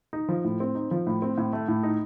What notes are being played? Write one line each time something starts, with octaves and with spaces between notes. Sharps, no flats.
D#4
F3
A2
C4
D#4
F3
A2
C4
A2
A3
A2
D#4